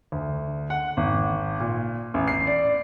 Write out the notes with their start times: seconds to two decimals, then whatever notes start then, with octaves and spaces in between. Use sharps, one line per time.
0.12 D2
0.70 F#5
0.97 G#1
1.60 A#2
2.14 A1
2.28 C7
2.47 D5